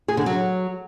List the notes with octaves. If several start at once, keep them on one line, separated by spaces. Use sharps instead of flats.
G#4
D3
F#3